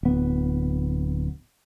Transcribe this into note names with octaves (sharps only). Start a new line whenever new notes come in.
D1 B3